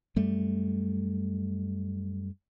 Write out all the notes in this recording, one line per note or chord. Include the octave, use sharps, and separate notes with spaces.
F#2 G3 A3